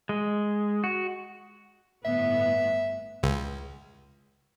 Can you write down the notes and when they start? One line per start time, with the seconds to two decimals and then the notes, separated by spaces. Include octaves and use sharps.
0.09 G#3
0.84 F#4
2.05 G1 A2 B3 E5
3.23 C#2